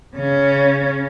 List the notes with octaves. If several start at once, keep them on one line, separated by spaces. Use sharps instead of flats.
C#3 C#4